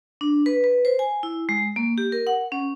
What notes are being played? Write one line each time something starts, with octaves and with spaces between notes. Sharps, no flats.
D4
B4
B4
C5
G#5
E4
G#3
A#3
G4
A#4
F#5
C#4